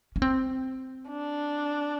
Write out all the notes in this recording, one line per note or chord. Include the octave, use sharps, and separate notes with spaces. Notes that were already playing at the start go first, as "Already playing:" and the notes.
C#4
C4
D4